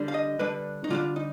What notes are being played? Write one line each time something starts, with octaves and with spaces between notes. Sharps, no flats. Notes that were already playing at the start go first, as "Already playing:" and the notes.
Already playing: D3 G3 D4
F5
D#5
D3 G3 D4 B4
D#4
D3 G3 D4 F4
D#4